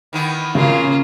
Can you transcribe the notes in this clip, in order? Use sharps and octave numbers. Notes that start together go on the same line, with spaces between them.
D#3 E3 B3
C#3 A#3 C#4 F4